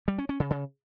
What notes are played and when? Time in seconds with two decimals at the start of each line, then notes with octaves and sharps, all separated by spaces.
0.08 G3
0.18 C#4
0.29 C#4
0.40 C#3
0.50 C#3